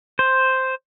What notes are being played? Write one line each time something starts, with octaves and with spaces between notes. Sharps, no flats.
C5